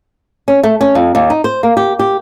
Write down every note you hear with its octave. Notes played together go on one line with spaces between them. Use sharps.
C#4
A3
C#4
F2
D#2
D#4
C5
A#3
G4
G4